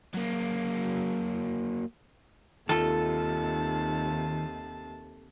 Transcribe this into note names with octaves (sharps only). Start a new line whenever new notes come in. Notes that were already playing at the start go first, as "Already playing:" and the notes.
F#3 A#3
D#2 C3 D#3 F4 A4 A5